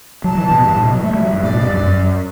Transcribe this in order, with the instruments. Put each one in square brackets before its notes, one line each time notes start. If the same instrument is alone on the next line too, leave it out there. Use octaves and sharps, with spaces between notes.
[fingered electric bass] F#3 [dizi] A5
[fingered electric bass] E3
B2
G2
A2
B2
F#3
[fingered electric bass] A3 [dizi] E5
[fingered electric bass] G3
F#3
G2
[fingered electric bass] A2 [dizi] D5
[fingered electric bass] B2
G2
F#2
F#2